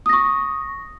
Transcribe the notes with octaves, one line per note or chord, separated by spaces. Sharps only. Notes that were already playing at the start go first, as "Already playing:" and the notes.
C#6 D#6 A#6